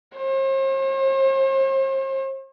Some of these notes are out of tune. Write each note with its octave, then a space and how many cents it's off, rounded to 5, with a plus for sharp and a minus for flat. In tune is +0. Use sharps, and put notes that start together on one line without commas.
C5 +45